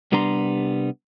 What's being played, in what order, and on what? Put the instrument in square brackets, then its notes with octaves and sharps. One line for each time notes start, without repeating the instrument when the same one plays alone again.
[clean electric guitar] C2 G3 B3 D4 A#5 C6